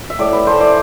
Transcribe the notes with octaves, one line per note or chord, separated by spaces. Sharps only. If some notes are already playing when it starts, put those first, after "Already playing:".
E5
A2 D5
B4
E3 A3 C5
D5